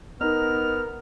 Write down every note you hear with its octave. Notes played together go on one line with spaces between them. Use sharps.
B3 D#4 A#4 F6